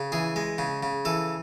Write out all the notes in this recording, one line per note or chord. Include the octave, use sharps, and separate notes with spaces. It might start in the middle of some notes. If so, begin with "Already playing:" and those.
Already playing: C#3
E3 G#4
G#3
C#3
C#3
E3 A4